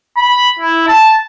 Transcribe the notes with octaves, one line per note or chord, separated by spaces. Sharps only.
B5
E4
A5